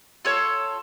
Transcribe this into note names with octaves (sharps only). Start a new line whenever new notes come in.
F4 A4 C#5